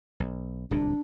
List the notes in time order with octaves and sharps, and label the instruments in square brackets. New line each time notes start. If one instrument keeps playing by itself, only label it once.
[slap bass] B1
[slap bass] D1 C2 A#2 [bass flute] D4